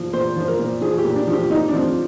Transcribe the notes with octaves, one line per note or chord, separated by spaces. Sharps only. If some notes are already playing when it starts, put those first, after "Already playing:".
Already playing: A#2 F3
A#2 C5
F3 C5
A#4
A#2
F3 G#4
G4
A#2
D4
F3
G4
A#2 D#4
D4
F3 C4